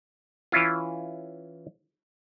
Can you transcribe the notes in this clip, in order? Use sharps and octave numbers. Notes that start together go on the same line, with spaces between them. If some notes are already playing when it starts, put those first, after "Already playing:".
E3 C#4 E4 F4